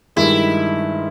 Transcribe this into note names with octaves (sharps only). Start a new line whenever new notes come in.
G2 D#3 G#3 E4